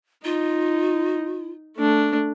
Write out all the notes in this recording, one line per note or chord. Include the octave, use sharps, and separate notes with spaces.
D#4 F4
A3 D4